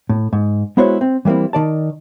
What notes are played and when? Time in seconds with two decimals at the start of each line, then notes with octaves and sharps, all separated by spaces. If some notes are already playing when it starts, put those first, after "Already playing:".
0.09 A2
0.33 G#2
0.77 G#3 B3 E4 F#4 C5 C#5
1.01 C4
1.25 E3 G3 A#3 C4 E4
1.53 D#3 D5 A5